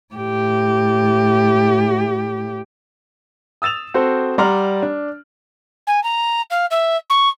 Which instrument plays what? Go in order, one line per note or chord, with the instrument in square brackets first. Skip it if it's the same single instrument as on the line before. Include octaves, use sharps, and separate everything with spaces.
[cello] A2 G4
[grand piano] D#6 E6 A6 E7 F7
C4 F#4 A4 C5
G3 D5 F#5 A#5 C6 F6
D4
[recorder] G#5
A#5
F5
E5
C#6